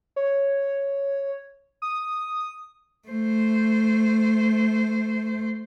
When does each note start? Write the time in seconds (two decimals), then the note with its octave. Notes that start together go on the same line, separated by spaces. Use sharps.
0.16 C#5
1.82 D#6
3.08 A3 C5